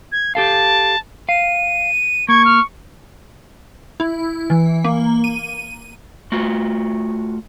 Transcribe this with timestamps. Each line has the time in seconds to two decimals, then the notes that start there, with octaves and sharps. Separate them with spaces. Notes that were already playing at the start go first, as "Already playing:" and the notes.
0.12 G#6
0.35 G4 A4 F5 A5
1.29 F5 D#7
2.29 A#3 C#6 G#6
2.45 F6
4.00 E4
4.50 E3
4.85 A#3
5.24 D#7
6.32 A3 F4 F#4